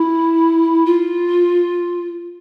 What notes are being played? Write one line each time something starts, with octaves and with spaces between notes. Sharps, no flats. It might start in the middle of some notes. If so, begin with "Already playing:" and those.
Already playing: E4
F4